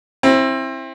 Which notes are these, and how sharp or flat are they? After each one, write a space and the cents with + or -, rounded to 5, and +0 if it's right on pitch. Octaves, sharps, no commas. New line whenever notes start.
C4 +25 E4 +0